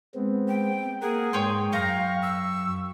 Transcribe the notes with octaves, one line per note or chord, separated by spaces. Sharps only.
G#3 B3 C4
G5
A#3 G#4 A#4 F#5
G#2 C#5 G5 C6
F#2 F5 G5 A#5 C#6
E6